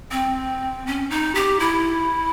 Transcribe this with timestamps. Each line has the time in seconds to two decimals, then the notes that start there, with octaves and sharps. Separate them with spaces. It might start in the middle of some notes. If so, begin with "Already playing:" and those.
0.11 C4
0.87 C#4
1.10 D#4
1.35 G4
1.60 E4